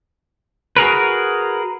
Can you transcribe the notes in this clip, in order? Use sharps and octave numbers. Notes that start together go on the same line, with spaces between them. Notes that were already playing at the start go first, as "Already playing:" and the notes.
F#4 G#4 A#4 B4